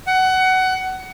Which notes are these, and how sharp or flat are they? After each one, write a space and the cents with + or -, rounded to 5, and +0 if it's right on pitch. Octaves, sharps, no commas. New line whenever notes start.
F#5 +20